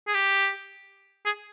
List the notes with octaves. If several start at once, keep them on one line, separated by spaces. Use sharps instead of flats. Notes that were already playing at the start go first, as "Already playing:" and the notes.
G#4
G4
G#4